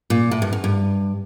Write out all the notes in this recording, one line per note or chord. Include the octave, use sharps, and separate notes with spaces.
A#2
A2
G2
E2
G2